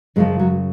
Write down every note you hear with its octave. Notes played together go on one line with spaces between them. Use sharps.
F#2 C#3 F3 G#3
F#3